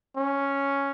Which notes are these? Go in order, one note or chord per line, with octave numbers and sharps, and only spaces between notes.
C#4